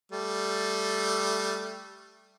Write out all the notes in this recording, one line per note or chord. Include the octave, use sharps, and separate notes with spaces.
G3 A3